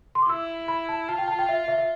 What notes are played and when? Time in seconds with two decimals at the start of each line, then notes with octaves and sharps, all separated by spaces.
0.15 C6
0.22 D6
0.29 E4 E6
0.68 B5
0.89 A5
1.08 F4 A5
1.18 G5
1.28 A5
1.39 G5
1.49 E5
1.68 E5
1.78 E5